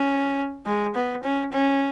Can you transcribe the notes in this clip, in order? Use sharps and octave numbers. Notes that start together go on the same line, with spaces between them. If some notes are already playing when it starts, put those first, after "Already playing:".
Already playing: C#4
G#3
B3
C#4
C#4